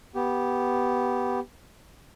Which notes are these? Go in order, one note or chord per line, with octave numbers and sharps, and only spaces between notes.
B3 G4